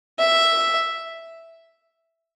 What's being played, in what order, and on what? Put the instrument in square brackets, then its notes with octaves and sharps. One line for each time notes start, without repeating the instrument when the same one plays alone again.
[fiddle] E5